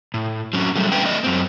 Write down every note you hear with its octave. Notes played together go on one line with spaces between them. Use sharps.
A2
F#3 C4 C#4
F#3 G3 A3
A2 D3 A3 B4 E5 G5
A3 D5 D#5
F#2 C4